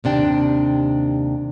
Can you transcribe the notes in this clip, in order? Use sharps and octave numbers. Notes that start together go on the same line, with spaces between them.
D#2 C3 D4 G5